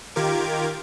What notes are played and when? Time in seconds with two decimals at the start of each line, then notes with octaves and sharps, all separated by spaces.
0.16 D#3 F4 G4 A#4 D6 G#6